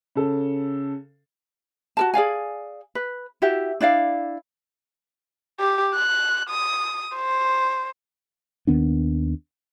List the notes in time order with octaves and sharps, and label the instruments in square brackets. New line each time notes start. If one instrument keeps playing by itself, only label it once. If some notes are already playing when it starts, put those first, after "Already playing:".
[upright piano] C#3 A4
[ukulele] F#4 A#4 A5
G#4 D5 F5 G#5
B4
E4 F#4 G4 E5
D4 E4 D5 F5
[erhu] G4
F#6
D#6
C5
[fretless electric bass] D#2 D#3 B3 D4